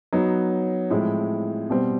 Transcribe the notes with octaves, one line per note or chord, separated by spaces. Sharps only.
F#3 B3 D#4
A2 F3 G#3 C4 E4
B2 G3 C4